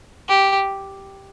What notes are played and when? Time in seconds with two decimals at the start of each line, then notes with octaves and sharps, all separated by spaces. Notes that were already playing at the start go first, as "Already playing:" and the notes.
0.29 G4